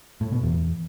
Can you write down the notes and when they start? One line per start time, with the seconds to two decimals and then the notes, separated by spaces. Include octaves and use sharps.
0.21 A2
0.32 B2
0.43 E2